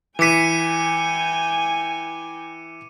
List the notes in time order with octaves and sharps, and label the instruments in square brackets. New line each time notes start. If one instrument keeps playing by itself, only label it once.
[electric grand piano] E3 B6 [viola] G5 G#5 [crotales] D6 C#7 D#7